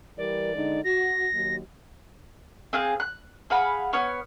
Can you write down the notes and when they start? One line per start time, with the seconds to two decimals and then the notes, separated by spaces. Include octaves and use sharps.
0.18 E3 G3 A#4 D5
0.55 D3 G#3 D#4
0.84 F#4 A#6
1.33 D#2 F#3
2.73 C4 G#4 F5 F#6
3.00 F#6
3.50 G#4 F5 F#5 B5
3.93 B3 C#5 F6